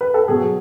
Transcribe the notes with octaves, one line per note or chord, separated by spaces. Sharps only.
B4
A4
B2 F#3 G#4